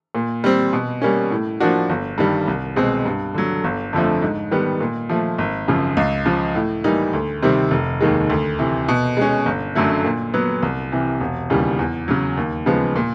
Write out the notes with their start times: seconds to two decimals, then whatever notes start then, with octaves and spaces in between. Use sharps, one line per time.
0.15 A#2
0.44 G3 C4
0.73 B2
1.02 G3 A#3 C#4
1.31 A2
1.60 F3 A#3 D4 F#4
1.89 G1
2.18 G2 D#3 G3
2.48 C2
2.76 B2 G#3 C4
3.05 G2
3.34 D3 F#3
3.64 G1
3.93 F2 D3 F3 A3
4.22 G#2
4.51 D#3 G3 B3
4.80 A#2
5.09 F3 A3
5.38 G#1
5.68 F#2 C#3 F3
5.97 C#2
6.26 C#3 F3
6.55 A2
6.84 E3 G3 A#3 D#4
7.13 D2
7.42 C3 D#3 G3 C4
7.71 F1
8.01 D#2 D#3 G#3
8.30 D2
8.59 C3 E3
8.88 B2
9.17 G#3 C#4
9.46 G1
9.75 F#2 D3 F#3 A3
10.05 A#2
10.34 F#3 B3
10.63 C2
10.92 C3 E3
11.20 E1
11.50 D#2 C#3 E3 G3
11.79 E2
12.08 C#3 F#3
12.37 D#2
12.66 C#3 F3 G#3 B3
12.96 A#2